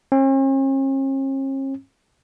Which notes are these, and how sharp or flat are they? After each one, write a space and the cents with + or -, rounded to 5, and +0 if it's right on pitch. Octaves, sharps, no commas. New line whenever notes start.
C#4 -45